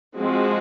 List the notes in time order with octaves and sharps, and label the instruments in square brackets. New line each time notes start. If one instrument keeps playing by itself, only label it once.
[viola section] F3 G#3 C4 F#4